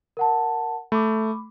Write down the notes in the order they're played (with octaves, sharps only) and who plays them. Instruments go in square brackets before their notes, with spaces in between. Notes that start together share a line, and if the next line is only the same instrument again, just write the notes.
[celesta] A#4 F#5 A5
[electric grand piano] A3 [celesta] B5 D6